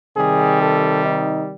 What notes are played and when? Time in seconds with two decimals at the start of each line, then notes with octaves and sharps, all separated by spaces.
0.15 C3 D#3 G3 G#4
0.60 A4
1.03 D#4